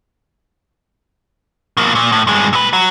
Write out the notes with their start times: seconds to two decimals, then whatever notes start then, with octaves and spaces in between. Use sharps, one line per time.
1.77 B2 A#3
1.95 A#2
2.12 A2
2.27 G2 G#3
2.53 A#2 B4
2.73 F#3